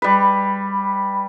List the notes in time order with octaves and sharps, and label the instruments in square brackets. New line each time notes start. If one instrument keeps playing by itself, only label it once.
[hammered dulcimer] G3 B4